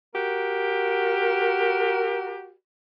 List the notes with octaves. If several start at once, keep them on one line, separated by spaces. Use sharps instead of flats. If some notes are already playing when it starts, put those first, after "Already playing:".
F#4 G4 A#4